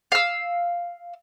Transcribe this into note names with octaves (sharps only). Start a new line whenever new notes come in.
F5 E6